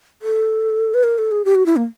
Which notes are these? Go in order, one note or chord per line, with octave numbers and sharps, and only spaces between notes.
A4
B4
A#4
A4
G#4
G4
F#4
E4
A#3